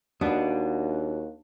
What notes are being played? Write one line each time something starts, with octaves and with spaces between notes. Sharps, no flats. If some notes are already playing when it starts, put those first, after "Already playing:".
D#2 D4 F#4 D#5